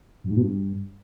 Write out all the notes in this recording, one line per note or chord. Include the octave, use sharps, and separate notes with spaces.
F#2
G#2
B2
G2